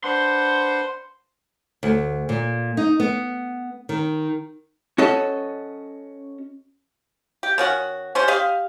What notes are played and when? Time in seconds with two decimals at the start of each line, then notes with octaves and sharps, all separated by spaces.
0.04 D4 B4 C5 F#5 C6
1.83 D2
2.29 A#2
2.77 D#4
3.00 B3
3.89 D#3
4.98 C#4 F#4 A4 D#5
7.43 G4
7.58 D#3 C#4 F#4
8.15 C3 C#4 C5
8.28 G4 D#5 F5